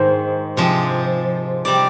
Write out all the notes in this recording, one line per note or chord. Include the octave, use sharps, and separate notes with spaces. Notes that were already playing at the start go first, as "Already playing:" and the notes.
Already playing: G#2 D#3 G#3 C5
C3 F3 G#3
C3 G3 D5